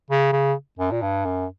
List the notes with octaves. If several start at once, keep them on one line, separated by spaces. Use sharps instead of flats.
C#3
C#3
F#2
A#2
G2
F#2